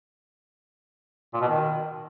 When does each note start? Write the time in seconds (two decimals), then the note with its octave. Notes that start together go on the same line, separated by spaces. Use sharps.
1.34 A#2
1.41 B2
1.48 D#3